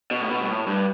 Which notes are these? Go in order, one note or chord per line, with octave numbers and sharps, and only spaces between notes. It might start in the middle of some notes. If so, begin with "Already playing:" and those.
B2
A2
B2
G2
A2
G2